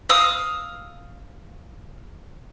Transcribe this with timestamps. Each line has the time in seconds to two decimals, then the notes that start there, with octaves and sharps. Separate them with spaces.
0.09 F5 D#6 E6